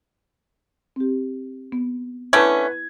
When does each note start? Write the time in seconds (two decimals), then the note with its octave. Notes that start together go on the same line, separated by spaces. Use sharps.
0.96 C4 G4
1.72 B3
2.33 D3 A3 C#4 E4 B4 A5 G6 G#6